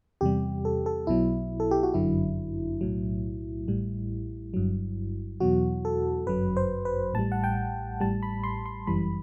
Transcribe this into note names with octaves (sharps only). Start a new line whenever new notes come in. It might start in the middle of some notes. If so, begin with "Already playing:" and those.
E2 C3 G3 G4
A4
A4
B1 B2 F#3 E4
A4
G4
F#4
G1 F#2 D3 F#3 E4
B1 A2 F#3
A1 A2 G3
G1 G2 F#3
E2 B2 F#3 F#4
A4
G1 F#2 F#3 B4
C5
B4
A1 A2 G3 A5
F#5
G5
A1 A2 G3 A5
B5
C6
C6
G1 F#2 E3 G3 B5